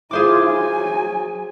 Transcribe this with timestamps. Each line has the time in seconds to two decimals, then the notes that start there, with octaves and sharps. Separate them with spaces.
0.11 E4 F4 G#4 C5 D6
0.47 F#3 G#5